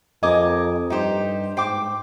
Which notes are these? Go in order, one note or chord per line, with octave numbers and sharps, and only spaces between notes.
F2 A#4 D#5 G#5 D6
G2 D#4 G4 C5
G#2 C5 G5 D6